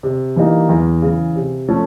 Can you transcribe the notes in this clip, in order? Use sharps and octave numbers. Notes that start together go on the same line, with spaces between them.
C3
E3 G3 A#3 D#4
E2
C#3 E3
C3
F3 A3 C#4